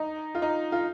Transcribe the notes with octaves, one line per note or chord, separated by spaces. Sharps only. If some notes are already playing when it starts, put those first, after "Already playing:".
Already playing: D#4
F4
D#4
F4